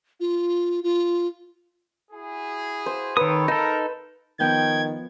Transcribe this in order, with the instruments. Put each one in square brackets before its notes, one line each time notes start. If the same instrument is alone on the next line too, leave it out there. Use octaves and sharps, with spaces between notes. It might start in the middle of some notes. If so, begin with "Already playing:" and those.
[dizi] F4
F4
[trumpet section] E4 F#4 G#4
[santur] C5
[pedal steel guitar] D#3 D#6 [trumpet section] C4 A4 C#5 [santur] B4
[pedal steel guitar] D#4 A4 [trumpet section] A#4 [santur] E6
[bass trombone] D#3 [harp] F3 B3 G6 [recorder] G5 [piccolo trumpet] G#6